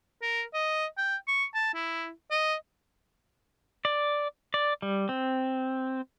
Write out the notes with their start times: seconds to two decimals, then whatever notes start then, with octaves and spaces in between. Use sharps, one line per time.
0.22 A#4
0.54 D#5
0.98 G5
1.28 C#6
1.55 A5
1.75 E4
2.31 D#5
3.85 D5
4.54 D5
4.82 G3
5.09 C4